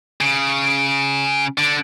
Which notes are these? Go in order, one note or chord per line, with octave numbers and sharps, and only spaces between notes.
C#3
D3